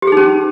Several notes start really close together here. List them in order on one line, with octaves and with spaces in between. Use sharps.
G4 G#4 D#4 C#4